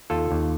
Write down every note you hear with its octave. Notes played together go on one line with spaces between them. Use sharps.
D#2 F4 A4
D#2